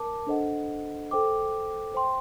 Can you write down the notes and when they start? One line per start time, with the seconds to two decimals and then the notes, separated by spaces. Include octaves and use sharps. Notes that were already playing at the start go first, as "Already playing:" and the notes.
Already playing: A#4 A5 D6
0.27 D4 A4 C5 D#5 F#5
1.11 A4 C5 G5 D6
1.94 C5 G5 C6